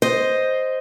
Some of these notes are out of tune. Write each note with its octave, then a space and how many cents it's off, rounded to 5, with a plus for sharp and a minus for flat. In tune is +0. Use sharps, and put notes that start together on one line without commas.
C5 +0 D#5 +0